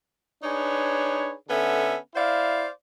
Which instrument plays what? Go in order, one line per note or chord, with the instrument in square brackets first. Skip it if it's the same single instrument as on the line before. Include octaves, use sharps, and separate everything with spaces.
[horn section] D4 D#4 G#4 B4 C#5
D3 B3 C#4 A4 E5
E4 C5 D5 F5